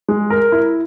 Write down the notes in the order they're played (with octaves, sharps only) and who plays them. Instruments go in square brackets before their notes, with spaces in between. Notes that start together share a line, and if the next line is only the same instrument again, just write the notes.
[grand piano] G#3
A#4
E4